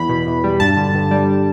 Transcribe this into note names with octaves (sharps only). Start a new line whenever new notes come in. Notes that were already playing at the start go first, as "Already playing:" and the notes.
Already playing: E2 B5
B2
E2
G3
G2 A5
D3
G2
G3